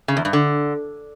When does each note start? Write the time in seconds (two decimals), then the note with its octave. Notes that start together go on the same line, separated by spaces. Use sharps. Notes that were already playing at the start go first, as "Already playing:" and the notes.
0.08 C#3
0.17 E2
0.25 G2
0.33 D3